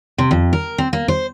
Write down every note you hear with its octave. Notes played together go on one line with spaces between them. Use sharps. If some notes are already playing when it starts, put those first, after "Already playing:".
C3
F2
A#4
C4
A#3
C5